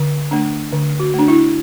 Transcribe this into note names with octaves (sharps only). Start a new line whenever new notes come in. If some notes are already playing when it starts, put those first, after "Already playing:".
Already playing: D3
A3 D4
D3
F#4
A3 D4
E4